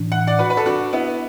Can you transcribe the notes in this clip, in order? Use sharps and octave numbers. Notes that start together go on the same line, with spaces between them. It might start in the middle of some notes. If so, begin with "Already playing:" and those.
Already playing: A2 E3 D4
F#5
D5 F#5
F#4 B4
B4
A4
D4 F#4
B3 E4